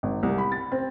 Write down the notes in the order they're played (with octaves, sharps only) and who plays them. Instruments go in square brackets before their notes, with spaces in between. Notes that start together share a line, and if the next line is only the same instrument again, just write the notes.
[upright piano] G#1
C2
B5
A6
C4